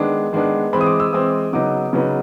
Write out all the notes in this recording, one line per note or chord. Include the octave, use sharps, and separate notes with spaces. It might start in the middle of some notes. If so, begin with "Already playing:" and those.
Already playing: D#3 G#3 B3 D4
D#3 G#3 B3 D4
E3 G#3 C4 B5
D#6
D6
E6
E3 G#3 C4 D#6
C#3 F#3 B3 D#4 D6
C#3 F#3 B3 D#4